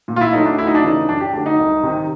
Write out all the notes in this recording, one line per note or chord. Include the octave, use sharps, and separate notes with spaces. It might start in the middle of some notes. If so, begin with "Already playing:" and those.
A#2
F4
E4
F#3 A3 D#4
D4
D2 E4
D#4
D4
C#3 E3 A3 D#4
F#2 D4
G4
D3 F#3 A3 D4
D#4
C2
C3 D#3